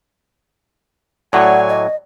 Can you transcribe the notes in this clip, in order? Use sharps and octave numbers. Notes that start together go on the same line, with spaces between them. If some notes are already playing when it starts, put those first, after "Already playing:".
A2 F#3 C#5 D5 F#5 G#5
D#5